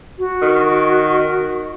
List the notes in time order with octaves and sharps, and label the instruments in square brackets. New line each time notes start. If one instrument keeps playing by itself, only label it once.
[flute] F#4
[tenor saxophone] D#3